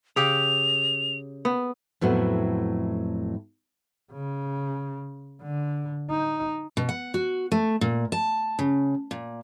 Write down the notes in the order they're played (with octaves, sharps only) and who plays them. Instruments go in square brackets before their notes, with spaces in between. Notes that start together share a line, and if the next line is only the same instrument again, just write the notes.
[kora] C#3 G4 [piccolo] F7
[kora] B3
[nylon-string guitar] F2 A2 F#3 B3 E4
[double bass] C#3
D3
D#4
[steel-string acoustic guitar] B2
F#5
F#4
A3
A#2
A5
C#3
A#2